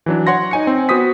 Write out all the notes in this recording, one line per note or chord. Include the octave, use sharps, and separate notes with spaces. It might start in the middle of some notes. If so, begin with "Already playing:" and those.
E3 F#3 D4
C#5 F#5 C6 A#6
D#4 G#5 C#7
C4
B3 F#4 C5 D#6 B6